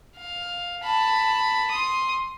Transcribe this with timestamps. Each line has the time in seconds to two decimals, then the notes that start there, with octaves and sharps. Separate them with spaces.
0.16 F5
0.83 A5 B5
1.71 C6 D#6